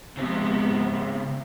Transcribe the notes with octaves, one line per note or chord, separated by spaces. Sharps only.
G#2 C#3 F3 B3 C4